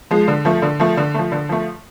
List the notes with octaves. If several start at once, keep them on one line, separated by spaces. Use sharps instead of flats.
F3 G#3
D3
F3 A3
D3
F3 A3
D3
F3 A3
D3
F3 A3